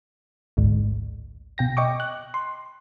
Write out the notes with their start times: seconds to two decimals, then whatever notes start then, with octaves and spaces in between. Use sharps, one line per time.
0.57 A1 D2 G#2
1.58 B2 G5 A#6
1.77 D#5 G5 C#6 D6
2.00 F#6
2.34 C6